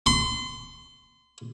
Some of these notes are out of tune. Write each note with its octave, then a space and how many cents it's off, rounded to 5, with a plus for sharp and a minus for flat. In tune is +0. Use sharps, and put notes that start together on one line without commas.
C6 -35